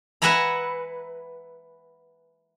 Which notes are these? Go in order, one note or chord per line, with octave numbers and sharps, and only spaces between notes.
B4 E5 F#5 G#5 A#5 B5